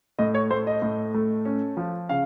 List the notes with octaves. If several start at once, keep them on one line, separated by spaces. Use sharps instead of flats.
A2 D#5
C#5
A3 C5
D#5
A2
A3
C#4
F3
C#3 F5